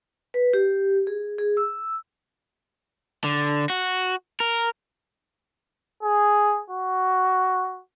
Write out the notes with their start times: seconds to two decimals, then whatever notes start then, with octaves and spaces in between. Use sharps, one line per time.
0.34 B4
0.53 G4
1.07 G#4
1.38 G#4
1.57 E6
3.24 D3
3.70 F#4
4.40 A#4
6.03 G#4
6.70 F#4